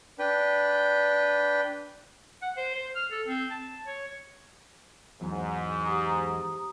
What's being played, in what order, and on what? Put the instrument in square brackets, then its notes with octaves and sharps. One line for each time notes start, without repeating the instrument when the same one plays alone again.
[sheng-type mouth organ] D4 B4 G5
[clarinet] F#5
C5
C5
F6
A4
C4
A5
C#5
[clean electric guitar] E2 F#3 [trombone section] G#2
[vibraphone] G4 A#5 D#6